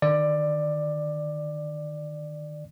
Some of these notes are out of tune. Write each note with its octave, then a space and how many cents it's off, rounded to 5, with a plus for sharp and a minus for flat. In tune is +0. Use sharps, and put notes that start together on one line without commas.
D#3 -25 D5 +15